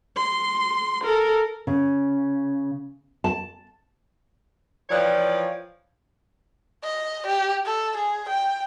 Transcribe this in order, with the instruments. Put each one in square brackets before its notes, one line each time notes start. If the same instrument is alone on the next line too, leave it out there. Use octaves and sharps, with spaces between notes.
[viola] C6
A4 A#4
[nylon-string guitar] C#3
A5
[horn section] E3 F3 C#5 D5 G5
[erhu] D#5
G4
A4
G#4
G5